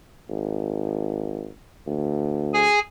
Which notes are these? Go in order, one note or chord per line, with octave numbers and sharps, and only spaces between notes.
G#1
D2
G#4 G#5